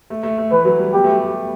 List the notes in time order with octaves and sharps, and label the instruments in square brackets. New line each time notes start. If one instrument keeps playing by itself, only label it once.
[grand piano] A3
A3
A3
[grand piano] E3 [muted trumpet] B4
[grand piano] F#3
G3
[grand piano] B3 [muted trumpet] G4
[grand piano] A3